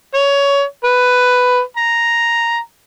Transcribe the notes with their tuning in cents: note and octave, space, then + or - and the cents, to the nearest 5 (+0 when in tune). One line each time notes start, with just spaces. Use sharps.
C#5 +20
B4 +10
A#5 +0